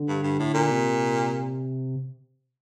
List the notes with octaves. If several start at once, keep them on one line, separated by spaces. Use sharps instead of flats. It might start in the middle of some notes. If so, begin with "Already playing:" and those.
Already playing: D3
G2
G2
A2
A#2
C3